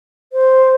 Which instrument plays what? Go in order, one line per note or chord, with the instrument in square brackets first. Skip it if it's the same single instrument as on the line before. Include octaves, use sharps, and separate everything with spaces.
[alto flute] C5